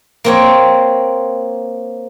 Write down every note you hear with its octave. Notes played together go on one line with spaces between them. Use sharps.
A#3 C4 C#5